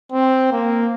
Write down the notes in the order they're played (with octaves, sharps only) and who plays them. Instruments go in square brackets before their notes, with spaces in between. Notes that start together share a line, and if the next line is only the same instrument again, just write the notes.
[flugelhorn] C4
A#3